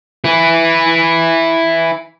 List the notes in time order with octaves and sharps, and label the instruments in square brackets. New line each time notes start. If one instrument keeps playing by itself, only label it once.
[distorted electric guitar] E4 B4